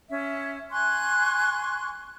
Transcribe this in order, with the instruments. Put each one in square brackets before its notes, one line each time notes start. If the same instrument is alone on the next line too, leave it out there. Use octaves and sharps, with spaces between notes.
[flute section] C#4 E5
G#5 C6 C#6 F#6